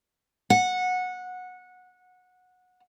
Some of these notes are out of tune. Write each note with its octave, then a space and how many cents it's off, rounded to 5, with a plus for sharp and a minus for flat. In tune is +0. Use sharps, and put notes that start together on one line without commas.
F#5 -20